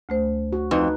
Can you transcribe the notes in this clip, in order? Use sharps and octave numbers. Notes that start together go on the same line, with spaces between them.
D2 A3 C5
F#4
F2 D#4 B4